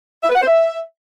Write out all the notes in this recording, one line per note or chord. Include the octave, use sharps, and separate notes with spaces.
E5
B4
F#5
C5
E5